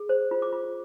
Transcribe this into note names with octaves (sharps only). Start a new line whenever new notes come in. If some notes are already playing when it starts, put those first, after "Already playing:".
Already playing: G#4
C5
F4
D6
F4